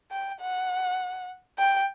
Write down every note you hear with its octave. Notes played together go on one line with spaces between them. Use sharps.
G5
F#5
G5